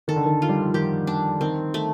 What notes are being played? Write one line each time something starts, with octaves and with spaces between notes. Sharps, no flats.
D#3 A4
D3
D#3
F4
G3
F3
D#3 G4
D4
D#3 C4
A3